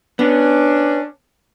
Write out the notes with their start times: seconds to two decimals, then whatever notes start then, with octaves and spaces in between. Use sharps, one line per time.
0.19 B3 C#4 D4